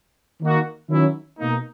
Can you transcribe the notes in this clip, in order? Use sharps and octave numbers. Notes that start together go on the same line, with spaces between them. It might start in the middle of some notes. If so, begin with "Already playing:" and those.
D#3 A#3 D#4 F#4
D#3 F#3 C#4 E4
B2 A#3 D#4